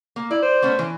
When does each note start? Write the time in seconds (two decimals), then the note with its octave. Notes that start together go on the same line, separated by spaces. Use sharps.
0.16 A#3
0.31 E4 D5
0.43 C5
0.62 A3 B3 C#4
0.79 E3